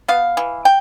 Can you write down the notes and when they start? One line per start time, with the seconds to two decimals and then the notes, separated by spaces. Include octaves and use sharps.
0.08 B3 F5
0.37 E3
0.65 G5